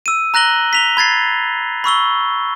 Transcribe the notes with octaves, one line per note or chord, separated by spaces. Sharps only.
E6 D#7
A#5 F#6 A#6 F#7 G7
B6 F7 G7
B5 G#6 A6 C7
B5 C#6 E6 G7